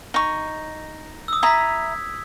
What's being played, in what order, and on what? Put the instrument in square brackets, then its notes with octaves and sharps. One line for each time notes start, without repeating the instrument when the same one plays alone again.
[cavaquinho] D#4 C#6
[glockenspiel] D#6 E6
[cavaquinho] E4 A#5 D#6 [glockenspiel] G#6 B6